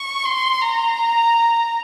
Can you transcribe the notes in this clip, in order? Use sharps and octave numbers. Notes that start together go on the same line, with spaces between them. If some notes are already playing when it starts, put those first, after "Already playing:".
Already playing: C#6
C6
A#5